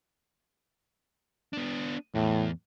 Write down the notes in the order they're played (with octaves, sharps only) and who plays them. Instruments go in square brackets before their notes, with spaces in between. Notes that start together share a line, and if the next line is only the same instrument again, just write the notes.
[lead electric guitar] B3 D4
[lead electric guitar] E2 [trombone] A2